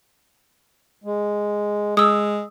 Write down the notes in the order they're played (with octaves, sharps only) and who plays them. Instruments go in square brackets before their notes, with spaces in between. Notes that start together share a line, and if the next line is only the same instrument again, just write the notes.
[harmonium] G#3
[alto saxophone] G#3 [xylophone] D#6 E6